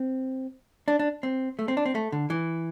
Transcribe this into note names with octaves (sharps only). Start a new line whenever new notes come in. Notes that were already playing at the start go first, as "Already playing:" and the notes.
Already playing: C4
D4
D4
C4
A3
C4
D4
C4
A3
D3
E3